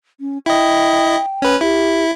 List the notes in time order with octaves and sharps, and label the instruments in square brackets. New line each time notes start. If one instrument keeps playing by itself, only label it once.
[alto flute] C#4
[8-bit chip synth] E4 D#5 [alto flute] G5
[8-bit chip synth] C#4 B4
[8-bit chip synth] E4 [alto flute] G4